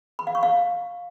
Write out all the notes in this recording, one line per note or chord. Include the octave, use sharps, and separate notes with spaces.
B5
F5
C#6
F5